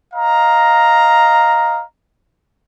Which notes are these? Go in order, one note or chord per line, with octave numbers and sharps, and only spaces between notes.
D#5 F5 A#5